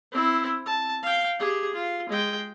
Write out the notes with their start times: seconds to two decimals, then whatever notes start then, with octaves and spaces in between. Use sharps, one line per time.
0.12 C4 E4
0.66 A5
1.02 F5 G5
1.39 G4 G#4
1.73 F4
2.09 G#3 G5